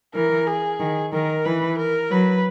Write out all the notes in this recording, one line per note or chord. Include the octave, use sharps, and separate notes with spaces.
E3 A#4
G#4
D#3
D#3 A#4
E3 B4
A#4
F#3 B4